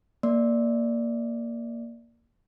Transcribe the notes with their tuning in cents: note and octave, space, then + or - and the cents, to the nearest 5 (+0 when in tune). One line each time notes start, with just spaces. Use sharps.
A#3 +0 D5 +0